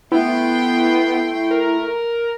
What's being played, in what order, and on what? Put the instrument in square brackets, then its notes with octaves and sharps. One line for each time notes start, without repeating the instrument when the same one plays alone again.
[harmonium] A3 [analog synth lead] B3 [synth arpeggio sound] E4 [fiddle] G5 C6
[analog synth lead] A#4